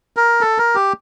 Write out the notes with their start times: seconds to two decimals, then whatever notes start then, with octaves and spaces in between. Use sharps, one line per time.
0.17 A#4
0.41 A4
0.58 A#4
0.75 G4